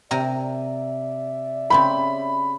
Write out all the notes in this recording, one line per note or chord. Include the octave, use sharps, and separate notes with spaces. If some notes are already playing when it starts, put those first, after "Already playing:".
C3 A#4 D5 E5 A#5
C#3 C4 G4 B5